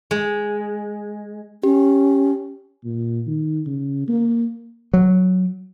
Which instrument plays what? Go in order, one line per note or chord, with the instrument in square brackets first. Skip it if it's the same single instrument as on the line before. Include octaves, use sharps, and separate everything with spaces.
[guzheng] G#3
[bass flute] C#4 [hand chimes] G4
[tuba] A#2
D#3
C#3
A#3
[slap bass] F#3